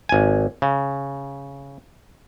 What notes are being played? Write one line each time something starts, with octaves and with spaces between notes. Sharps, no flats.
G#1 G#5
C#3